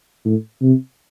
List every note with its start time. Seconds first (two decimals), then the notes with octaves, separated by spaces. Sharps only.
0.25 A2
0.62 C3